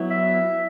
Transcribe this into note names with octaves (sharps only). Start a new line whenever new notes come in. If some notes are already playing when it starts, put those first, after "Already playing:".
Already playing: F#3 B3 E4
E5